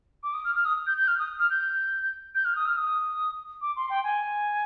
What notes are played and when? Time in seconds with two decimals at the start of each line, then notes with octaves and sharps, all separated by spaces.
0.23 D6
0.33 D#6
0.44 F6
0.55 F6
0.65 D#6
0.86 G6
0.97 G6
1.08 F6
1.19 D#6
1.39 F6
1.50 G6
2.35 G6
2.45 F6
2.55 D#6
2.66 F6
2.77 D#6
3.61 D6
3.76 C6
3.90 G5
4.04 G#5